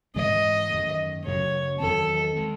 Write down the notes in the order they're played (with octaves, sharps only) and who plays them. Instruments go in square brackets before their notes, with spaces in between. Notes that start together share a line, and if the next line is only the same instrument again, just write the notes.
[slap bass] G#2 E3 G#3 C4 [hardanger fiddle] D#5
[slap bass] F#2 D#3 A3
[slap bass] F#2 C#3 F#3 A3 [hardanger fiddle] C#5
[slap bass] E2 D#3 F#3 C4 [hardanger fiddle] A4
[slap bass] D#3 G#3